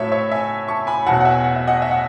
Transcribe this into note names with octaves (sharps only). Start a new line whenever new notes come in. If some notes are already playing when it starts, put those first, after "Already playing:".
Already playing: A2 F#3 A4 C#5 E5
C#5 E5
E5 G#5
A5 C#6
G#5 B5
E2 B2 F#3 F#5 A5
F#5
E5 G#5
F#5
E5
D#5 F#5
E5
F#5